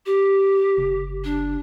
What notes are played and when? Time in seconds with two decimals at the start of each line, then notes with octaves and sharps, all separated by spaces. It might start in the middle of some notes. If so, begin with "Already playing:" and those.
0.06 G4
0.77 F#1
1.24 D4